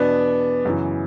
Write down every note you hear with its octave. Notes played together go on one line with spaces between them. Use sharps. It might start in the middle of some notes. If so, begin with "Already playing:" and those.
Already playing: E2 B2 B3 D4
F#2 C#3 E3